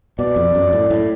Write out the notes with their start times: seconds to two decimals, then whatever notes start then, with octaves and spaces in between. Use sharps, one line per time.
0.19 B2 D5
0.36 F2
0.55 F#2
0.73 A2
0.90 A2